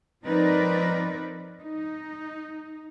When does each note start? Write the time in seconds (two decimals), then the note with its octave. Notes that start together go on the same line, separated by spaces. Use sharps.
0.23 F3 C4 D#4 A#4 B4 D5
1.62 D#4